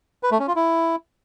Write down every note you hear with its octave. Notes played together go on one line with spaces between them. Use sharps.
B4
A3
C#4
F4
E4